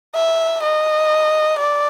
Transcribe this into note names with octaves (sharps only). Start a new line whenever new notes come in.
E5
D#5
D5